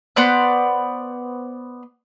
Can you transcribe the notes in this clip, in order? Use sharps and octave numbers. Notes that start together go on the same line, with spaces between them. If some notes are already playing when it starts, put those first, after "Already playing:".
B3 C5 D5 F#6